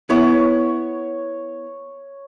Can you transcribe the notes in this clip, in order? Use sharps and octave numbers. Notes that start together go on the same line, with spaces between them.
B3 E4 C#5